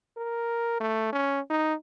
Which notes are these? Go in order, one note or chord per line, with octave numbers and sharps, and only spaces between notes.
A#4
A3
C#4
D#4